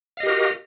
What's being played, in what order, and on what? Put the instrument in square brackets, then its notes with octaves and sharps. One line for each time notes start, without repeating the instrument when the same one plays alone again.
[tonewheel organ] F5
D#5
G4
A#4
F#4